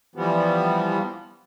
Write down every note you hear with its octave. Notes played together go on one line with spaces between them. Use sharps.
E3 F3 G3 B3